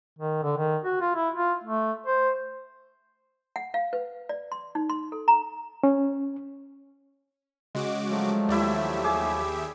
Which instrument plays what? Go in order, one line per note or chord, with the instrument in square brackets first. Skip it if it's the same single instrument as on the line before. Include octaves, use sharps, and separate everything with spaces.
[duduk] D#3
D3
D#3
F#4
F4
E4
F4
A3
C5
[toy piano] F#5
F5
B4
D5
C6
D#4
C6
A4
A#5
[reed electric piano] C#4
[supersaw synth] C#3 F#4 D6 [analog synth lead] G#3
[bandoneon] F3 F#3 A3
[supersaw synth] D#2 G4 E5 [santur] E4 D5
[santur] G#4 [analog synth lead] D6